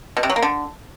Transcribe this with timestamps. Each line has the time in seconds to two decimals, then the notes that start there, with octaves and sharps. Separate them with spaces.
0.17 B2
0.23 C3
0.30 F#3
0.36 A#3
0.42 D3